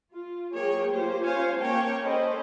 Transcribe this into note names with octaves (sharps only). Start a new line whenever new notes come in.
F4
F#3 A#3 G#4 C#5 G5
A#3 F4 G4 C5
C#4 F4 C5 C#5 F5 G#5
A#3 C#4 A#4 C#5 G5 A5
C#4 A4 C5 D#5 B5